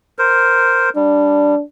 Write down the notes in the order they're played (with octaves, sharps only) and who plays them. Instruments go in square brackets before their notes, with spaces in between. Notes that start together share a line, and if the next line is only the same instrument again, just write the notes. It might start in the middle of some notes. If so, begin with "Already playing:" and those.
[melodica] A#4 C5
[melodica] G3 [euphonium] D4